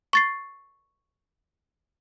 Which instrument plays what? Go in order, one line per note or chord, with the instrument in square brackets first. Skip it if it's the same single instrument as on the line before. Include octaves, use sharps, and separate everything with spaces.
[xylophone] C#6 A6 C7